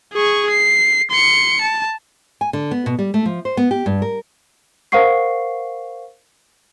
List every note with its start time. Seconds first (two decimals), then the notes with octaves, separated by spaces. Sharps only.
0.14 G#4 C#6
0.50 C7
1.11 C6 C#7
1.61 A5
2.41 G#5
2.53 D3
2.71 B3
2.86 B2
2.99 G3
3.14 A3
3.26 F3
3.45 C5
3.57 B3
3.71 G4
3.86 G2
4.02 A#4
4.92 A#4 C5 F5 F#5 C#6 C7